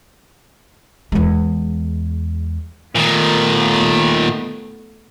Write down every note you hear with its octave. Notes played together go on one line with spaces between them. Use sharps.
E2 G#3
A#2 D#3 A3 B3